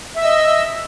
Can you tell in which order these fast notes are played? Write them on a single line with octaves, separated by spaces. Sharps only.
E5 E6 D#5